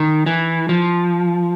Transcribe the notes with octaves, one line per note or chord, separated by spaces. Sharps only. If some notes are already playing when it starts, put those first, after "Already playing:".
Already playing: D#3
E3
F3